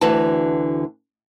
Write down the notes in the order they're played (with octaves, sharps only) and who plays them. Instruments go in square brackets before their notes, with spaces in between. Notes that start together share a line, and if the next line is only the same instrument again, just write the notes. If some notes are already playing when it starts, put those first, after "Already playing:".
[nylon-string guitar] D2 D3 E3 F#4 B4 A5